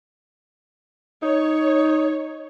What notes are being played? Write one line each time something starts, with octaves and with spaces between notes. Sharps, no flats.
D#4 C#5